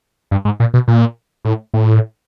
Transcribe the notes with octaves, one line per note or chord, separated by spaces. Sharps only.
G2
G#2
A#2
B2
A#2
A2
A2